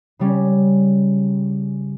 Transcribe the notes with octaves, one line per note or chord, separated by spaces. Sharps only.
C#3 G3 C#4